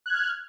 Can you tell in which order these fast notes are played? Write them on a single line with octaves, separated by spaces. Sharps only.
F#6 G#6 F6